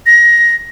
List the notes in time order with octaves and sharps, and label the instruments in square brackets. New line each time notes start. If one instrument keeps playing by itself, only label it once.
[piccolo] A#6